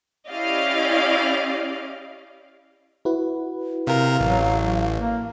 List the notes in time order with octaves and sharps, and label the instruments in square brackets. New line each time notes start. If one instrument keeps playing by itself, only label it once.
[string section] C#4 E4 G4 D5 D#5 F5
[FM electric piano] E4 F#4 B4
[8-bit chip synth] C3 A#4 [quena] F5
[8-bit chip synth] A1 [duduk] F#3
[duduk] A#3